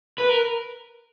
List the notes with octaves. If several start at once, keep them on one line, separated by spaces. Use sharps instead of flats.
B4
A#4